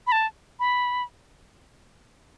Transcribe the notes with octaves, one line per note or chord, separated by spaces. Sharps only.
B5
A5
B5